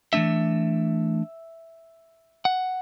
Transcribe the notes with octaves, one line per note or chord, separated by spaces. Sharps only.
E3 A3 D4 E5
F#5